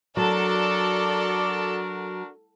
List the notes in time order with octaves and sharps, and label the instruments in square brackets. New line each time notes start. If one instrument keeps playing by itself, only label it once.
[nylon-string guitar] F#3 [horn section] D4 F#4 A#4 [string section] A4 [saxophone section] D5